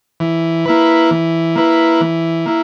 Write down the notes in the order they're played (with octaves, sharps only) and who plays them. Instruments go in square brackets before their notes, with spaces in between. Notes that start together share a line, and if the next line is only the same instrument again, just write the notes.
[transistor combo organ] E3
A#3 E4 B4
E3
A#3 E4 B4
E3
A#3 E4